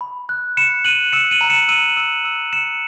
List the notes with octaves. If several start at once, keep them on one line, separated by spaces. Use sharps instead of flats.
B5
F#6
B5 C#7 E7
F#6 D#7 F#7
E6 C#7 E7
D#7 F#7
A#5
C#7 E7
E6 D#7 F#7
E6
E6
E6 C#7 E7